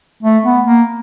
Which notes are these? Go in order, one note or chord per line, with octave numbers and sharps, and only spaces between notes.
A3
B3
A#3